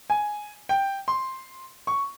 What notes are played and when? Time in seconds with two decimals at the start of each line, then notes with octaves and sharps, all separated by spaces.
0.10 G#5
0.69 G5
1.08 C6
1.87 C#6